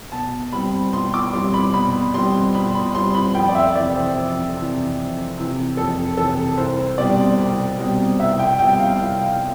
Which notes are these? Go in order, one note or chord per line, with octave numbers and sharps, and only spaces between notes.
B2 A5
G3 C4 B5
B2 C6
D6
G3 C4 C6
B5
B2 B5
G3 C4 C6
B2 B5
B5
G3 C4 C6
B5
F2 G5
D5
E5
C3 E3 D5
C5
F2
C3 E3
F2
C3 E3
F2 A4
C3 E3 A4
C2 C5
B2 G3 C4 D5
C2
B2 G3 C4
C2 E5
G5
B2 G3 C4 G5
F5
C2